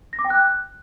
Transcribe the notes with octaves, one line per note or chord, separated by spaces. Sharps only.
A#6
D6
G5
F#6